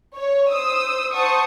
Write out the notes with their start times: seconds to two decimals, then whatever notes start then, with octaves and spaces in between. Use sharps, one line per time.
0.16 C#5
0.50 C5 D#6 E6
1.13 C5 F#5 A5 C#6 D#6